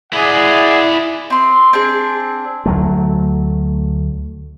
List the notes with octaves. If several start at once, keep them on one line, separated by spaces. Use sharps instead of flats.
E4 G#4 D5 D#5 F#5
C4 C6
C4 D4 G#4
D2 F#3 A3